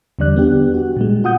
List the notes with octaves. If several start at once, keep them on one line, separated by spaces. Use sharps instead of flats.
E2 D3 G3 D5 F#6
B3 D4 G4
F#4
A#2 G3 G#3
F4 F#5 D#6 G6